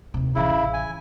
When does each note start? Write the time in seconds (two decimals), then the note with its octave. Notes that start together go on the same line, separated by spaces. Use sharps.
0.14 D#2 C3
0.35 A1 C#3 E3 E4
0.73 G#5